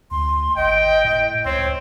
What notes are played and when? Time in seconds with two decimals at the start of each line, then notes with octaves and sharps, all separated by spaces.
0.11 D2 C6
0.57 G#1 D#5 G5
1.04 A2
1.45 C#2 C4 C#5